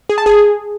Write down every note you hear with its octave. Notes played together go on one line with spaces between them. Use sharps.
G#4
A5
G#4